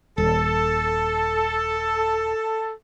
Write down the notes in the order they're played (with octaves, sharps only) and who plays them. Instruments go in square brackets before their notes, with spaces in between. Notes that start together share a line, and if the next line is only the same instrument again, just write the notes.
[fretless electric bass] D#1 [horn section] A4